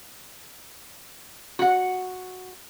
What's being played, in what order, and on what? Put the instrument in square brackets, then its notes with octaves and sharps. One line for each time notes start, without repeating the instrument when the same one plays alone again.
[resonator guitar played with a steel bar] F#4 F#5